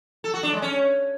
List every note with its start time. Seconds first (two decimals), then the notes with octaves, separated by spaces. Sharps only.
0.24 A4
0.34 F#4
0.43 D4
0.53 G#3
0.62 C#4